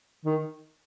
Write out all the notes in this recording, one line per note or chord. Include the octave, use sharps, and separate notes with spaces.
D#3